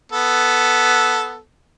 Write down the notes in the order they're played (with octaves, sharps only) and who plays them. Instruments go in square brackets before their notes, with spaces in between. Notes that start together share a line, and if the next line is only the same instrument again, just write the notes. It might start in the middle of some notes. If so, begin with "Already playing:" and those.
[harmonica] B3 A4